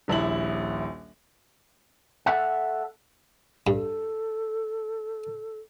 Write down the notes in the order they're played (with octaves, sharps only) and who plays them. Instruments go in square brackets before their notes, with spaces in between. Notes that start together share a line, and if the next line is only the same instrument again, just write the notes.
[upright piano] D#1 A#1 E4 F#7
[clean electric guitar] A4 E5 F#5
[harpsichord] G2 [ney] A4